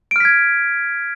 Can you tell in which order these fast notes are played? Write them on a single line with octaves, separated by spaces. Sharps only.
D7 F6 B6 G#6